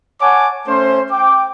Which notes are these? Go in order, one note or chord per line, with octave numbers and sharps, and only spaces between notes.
C#5 F#5 G#5 A5 D6
A3 C#4 C5
G5 D6